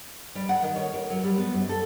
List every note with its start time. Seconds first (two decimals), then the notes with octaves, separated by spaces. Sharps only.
0.35 G3
0.49 F#5
0.62 D#3
0.76 C#5
0.94 A#4
1.10 F#3
1.24 G3
1.38 B3
1.54 F#2
1.69 A4